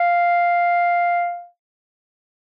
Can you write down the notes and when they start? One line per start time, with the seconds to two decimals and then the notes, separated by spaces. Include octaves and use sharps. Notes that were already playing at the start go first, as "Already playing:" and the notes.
Already playing: F5